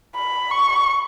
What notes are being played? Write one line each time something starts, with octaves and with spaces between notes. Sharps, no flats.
B5
C#6